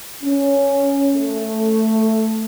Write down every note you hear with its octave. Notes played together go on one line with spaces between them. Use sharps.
C#4
A3